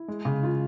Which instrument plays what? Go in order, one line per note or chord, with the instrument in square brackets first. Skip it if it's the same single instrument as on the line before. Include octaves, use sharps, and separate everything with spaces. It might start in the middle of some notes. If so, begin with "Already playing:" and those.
Already playing: [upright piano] E4
G#3
C#3
F4